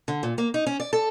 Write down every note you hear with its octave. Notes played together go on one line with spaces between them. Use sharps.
D3
A#2
A#3
D#4
C#4
D5
A4